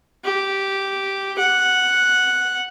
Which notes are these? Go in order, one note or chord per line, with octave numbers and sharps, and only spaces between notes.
G4
F#5